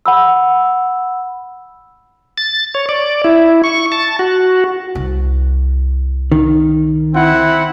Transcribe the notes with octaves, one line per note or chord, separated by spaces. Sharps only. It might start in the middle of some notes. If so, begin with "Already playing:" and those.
F#5 B5 E6
A6
C#5
D5
E4
C#6
A5
F#4
C2
D#3
C4 E4 F#5